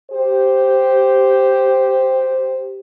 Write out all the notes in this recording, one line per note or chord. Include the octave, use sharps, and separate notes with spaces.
G4 C5